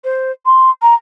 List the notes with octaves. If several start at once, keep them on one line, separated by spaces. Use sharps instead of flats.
C5
C6
A#5